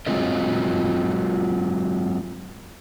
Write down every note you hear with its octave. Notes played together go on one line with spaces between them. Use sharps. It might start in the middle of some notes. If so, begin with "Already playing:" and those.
F#3 G#3 C4 F4 A#4 D#5